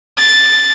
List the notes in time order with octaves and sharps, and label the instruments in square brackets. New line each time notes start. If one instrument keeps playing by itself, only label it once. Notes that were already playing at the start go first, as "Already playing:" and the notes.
[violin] A6